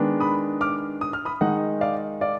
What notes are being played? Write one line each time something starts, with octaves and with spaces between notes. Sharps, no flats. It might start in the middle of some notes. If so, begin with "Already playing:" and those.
Already playing: D#3 G#3 B3 D4
B5 D#6
D6 F6
D#6
F6
B5 D#6
D#3 G#3 D#4 D#5 F#5
D5 F5
D5 F5